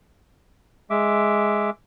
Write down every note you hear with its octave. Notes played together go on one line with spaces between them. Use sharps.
G#3 E5 D6